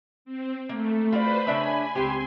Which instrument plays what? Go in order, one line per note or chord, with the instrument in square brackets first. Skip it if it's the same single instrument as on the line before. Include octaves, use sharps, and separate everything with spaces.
[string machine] C4
[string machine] A3 [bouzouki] A#3
[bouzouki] F4 F#4 D5 [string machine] B4 C5 [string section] B5
[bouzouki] C#3 D4 E5 [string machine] G#5
[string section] C#2 C4 C6 [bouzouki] G4 B4 C5